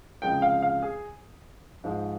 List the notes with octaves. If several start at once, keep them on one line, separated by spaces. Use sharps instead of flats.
C#2 C3 F3 G#3 G5
F5
F5
G#4
G#2 F3 G#3